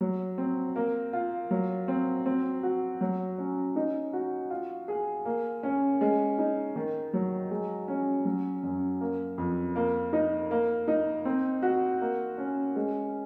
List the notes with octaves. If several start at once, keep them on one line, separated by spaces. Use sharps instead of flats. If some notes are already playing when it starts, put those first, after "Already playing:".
F#3
C4
A#3
F4
F#3
C4
C4
F#4
F#3
C#4
D#4
F#4
F4
G#4
A#3
C#4
G#3
D#4
D#3
F#3
G#3
C#4
F#3
F#2
A#3
F2
A#3
D#4
A#3
D#4
C4
F#4
A#3
C#4
G#3